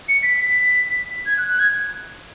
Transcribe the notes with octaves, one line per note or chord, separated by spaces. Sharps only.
C#7
B6
B6
G#6
F#6
F#6
G#6